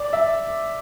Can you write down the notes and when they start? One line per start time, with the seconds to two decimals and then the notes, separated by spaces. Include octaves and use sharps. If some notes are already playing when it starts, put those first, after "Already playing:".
Already playing: D5
0.13 E5